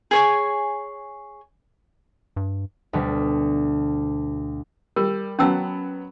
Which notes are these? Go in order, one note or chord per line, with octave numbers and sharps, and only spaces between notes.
G#4 C#5 G#5
G2
D2 B2 G3
G3 A#4
F#3 B3 C#4 G5 A5 E6